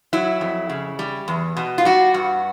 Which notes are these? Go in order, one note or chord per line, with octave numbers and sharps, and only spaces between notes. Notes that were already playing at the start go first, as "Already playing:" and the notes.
F#3 E4
F2
C#3
G3
E2
B2
F4
G3 F#4
G2